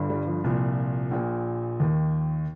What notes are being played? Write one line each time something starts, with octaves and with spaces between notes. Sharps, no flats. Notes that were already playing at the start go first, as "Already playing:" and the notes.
Already playing: G1 G2 D3
G3
F3
C2 A#2 F3
A#1 A#2
D#2 D#3